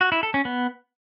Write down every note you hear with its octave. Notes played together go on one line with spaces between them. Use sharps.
F#4
E4
A4
C#4
B3